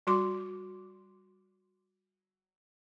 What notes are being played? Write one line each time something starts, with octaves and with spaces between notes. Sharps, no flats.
G3 F#4 C6 D6